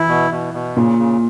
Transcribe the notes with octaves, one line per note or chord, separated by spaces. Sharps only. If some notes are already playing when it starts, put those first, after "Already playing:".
Already playing: E3 E4
B2
B2
B2
A#2 C#3
C#3